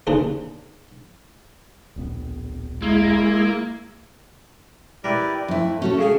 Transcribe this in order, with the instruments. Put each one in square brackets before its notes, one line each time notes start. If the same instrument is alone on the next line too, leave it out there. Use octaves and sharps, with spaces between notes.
[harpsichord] D#2 C#3 D4 G#4 C5
[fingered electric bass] D1 A#1 B3
[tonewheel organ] G#3 E4 [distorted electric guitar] A#3
[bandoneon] E4 G4 D5 [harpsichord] A#4 B4
[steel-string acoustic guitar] F2 E4 [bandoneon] A3
[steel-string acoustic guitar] C#4 F#4 A4
[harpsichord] C#3 G#4 G#5